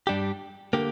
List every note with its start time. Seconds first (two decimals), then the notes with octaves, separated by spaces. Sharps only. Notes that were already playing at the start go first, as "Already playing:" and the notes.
0.07 G2 G3 D4 G4
0.73 D3 A#3 G4